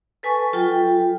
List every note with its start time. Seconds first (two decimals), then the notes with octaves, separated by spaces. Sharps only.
0.23 A4 B4 G#5 A5 C#6
0.53 F#3 F4 A4 G5